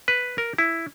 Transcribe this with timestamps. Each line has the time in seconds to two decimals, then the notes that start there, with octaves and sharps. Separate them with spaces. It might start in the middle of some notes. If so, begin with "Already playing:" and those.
0.08 B4
0.38 A#4
0.58 E4